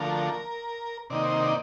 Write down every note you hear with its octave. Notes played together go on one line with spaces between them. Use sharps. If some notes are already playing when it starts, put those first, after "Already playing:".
Already playing: D3 F3 A3 A#4
C3 D#3 A#3 D#4 D5
C5
D5